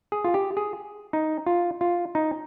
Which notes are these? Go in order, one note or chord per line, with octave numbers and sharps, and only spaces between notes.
G#4
F4
G4
G#4
D#4
F4
F4
D#4